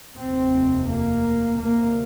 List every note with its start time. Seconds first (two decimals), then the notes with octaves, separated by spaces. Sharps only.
0.19 F1 D#2 C4
0.89 A#3
1.58 D2 C3 A#3